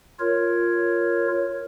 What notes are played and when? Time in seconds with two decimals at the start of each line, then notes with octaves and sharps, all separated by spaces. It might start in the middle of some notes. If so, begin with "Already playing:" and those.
0.20 F4 A#4 C#5